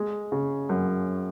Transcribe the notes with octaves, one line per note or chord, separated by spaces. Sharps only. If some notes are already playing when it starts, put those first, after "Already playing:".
Already playing: G#3
C#3
F#2